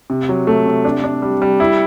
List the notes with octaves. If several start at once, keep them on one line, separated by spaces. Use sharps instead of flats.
C3
F#3
A3
C3
D4
D4
G3
G3
E4